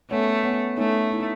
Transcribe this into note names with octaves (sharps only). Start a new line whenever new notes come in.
A3 B3 C#4
B3 C#4
A3 C#4 D#4
E4
D#4